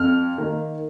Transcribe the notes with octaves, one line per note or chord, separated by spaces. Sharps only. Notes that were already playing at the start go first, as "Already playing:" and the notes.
Already playing: F2 F6
D#3 A#3